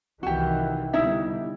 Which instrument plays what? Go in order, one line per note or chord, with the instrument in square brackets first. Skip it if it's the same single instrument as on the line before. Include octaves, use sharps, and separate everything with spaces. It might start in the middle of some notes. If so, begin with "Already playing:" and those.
[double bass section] C2 D#3 E3 [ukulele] F#4 G4
[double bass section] B2 D3 G3 [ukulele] D#4 E4 E5